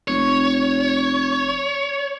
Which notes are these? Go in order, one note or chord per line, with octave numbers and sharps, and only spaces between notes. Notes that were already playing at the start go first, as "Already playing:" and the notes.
F1 C#5